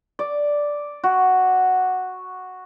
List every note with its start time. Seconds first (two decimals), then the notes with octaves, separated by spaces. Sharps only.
0.19 D5
1.04 F#4